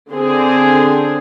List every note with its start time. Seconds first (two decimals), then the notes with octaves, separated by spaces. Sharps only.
0.13 D3 C4 G#4